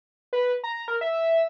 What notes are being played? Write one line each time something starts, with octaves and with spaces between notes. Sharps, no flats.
B4
A#5
A#4
E5